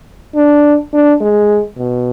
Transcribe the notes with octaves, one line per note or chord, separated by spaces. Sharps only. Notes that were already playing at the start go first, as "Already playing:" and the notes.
D4
D4
G#3
B2